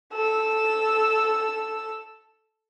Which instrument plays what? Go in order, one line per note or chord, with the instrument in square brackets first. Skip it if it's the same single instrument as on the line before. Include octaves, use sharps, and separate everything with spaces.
[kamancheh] A4 E6